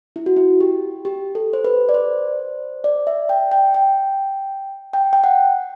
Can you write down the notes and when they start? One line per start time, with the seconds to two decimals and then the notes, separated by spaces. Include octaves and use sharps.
0.16 E4
0.26 F#4
0.36 E4
0.61 G4
1.05 G4
1.35 A4
1.53 C5
1.64 B4
1.89 D5
1.94 C5
2.84 D5
3.07 E5
3.29 G5
3.52 G5
3.74 G5
4.93 G5
5.13 G5
5.24 F#5